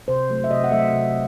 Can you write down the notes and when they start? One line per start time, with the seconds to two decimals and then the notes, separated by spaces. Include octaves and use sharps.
0.08 C3 C5
0.30 F#3 A3
0.44 E5
0.51 C3 D#5
0.64 F#5
0.72 F#3 A3 E5
0.93 C3